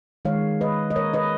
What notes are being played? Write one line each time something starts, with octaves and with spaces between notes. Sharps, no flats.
D#3 G#3 C#5 F5
B4 D#5
D#5
A#4 C#5
B4 D#5